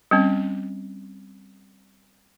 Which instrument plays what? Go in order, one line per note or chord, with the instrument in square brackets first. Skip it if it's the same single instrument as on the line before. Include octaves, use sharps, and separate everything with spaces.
[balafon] G3 C4 C#4